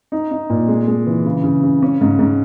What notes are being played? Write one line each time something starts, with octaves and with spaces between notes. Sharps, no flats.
D#4
D#4
A#2
G#3
G#3
E3
C#3
C#3
C#3
C#4
G#2
G#2